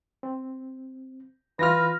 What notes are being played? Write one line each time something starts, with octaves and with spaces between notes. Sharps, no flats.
C4
E3 F4 B4 F6 A#6